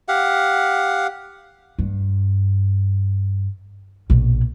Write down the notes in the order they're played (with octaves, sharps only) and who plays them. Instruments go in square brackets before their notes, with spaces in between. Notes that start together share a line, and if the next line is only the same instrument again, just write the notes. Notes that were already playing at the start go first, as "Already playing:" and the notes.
[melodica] G4 F5 F#5
[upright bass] G2
A#1 B2